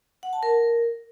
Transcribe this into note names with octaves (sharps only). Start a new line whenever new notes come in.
F#5
A5
A#4